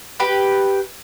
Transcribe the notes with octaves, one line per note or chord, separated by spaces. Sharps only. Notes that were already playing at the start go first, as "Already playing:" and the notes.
G4 B4